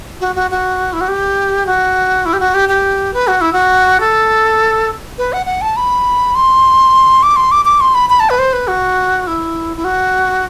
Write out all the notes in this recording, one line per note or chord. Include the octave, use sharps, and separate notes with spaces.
F#4
F#4
F#4
E4
F#4
G4
F#4
E4
G4
F#4
G4
G4
B4
F#4
E4
F#4
A4
B4
F#5
F#5
A5
B5
C6
D6
C6
D6
D6
C6
B5
B5
A5
B4
C5
B4
F#4
E4
E4
F#4